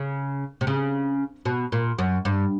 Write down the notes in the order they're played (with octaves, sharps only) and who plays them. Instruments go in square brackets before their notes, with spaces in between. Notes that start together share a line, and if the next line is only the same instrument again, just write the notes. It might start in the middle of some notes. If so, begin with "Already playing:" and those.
Already playing: [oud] C#3
C3
C#3
B2
A#2
F#2
G2